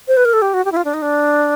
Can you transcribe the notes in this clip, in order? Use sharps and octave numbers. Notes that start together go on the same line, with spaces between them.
C5
B4
A#4
A4
G4
F#4
G4
E4
F4
D4
D#4
D4